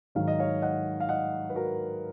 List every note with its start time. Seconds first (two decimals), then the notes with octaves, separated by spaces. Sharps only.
0.15 G#2 D#3 F#3 F5
0.28 D#5
0.39 C#5 F5
0.62 D#5 F#5
1.00 F5
1.09 D#5 F#5
1.50 B4
1.55 F#4 A#4